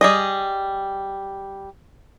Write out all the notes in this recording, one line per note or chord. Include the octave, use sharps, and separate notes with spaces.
G3 G#4 D#5